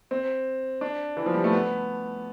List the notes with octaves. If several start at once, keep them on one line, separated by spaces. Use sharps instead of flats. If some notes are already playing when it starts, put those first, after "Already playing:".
C4
D4
E3
F3
G3
A3
B3